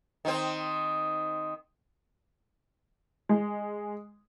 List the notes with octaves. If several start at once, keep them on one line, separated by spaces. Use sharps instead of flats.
D#3 C4
G#3